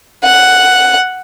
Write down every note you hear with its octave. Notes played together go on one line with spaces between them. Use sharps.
F#5